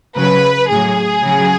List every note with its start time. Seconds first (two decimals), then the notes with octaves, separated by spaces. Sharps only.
0.16 C#3 F#3 B4
0.70 A2 F#3 G#4
1.23 C#3 F#3